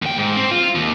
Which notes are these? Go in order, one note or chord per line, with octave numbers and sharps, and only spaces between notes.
D#2 G5
G#2
C4
F4
D#2